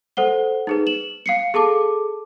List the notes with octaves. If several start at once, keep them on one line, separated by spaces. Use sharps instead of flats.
A4 C5 F#5 G7
D#4 G#4 B4
E7 F#7
F5 C7 C#7
G#4 A4 A5 D6